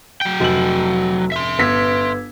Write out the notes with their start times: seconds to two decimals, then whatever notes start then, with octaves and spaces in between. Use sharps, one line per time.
0.21 F#3 G5
0.40 F1 F#4 E6 F#7
1.32 E5 C6
1.59 G1 B4 E6 G#6 B6